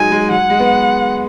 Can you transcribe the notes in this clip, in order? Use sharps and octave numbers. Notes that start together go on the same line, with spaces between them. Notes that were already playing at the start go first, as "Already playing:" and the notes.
Already playing: F#3 G#3 D#4 G#5
G#3
F#3 F#5
G#3
B3